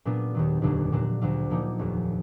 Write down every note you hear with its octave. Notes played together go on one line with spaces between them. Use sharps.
A#2 F#3 B3 D4 F4
D#2 D#3 F#3
F1 D#2 D3 F#3 D4
A#2 F#3 D4
D2 D3 F#3 D4 F4
A#2 F3 A#3 D#4
F1 D#2 D#3